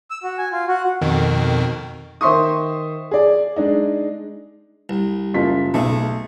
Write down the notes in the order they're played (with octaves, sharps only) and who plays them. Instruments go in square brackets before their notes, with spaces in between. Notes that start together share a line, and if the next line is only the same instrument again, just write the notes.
[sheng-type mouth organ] E6
F#4
G#5
F4
F#4
[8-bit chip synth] F2 B2 D#3
[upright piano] D#3 C5 E5 C6 C#6 D#6
G#4 D5
G#3 D4 D#4
[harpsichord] C2
[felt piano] F#1 F4 B6
[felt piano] B1 [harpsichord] G#3 A3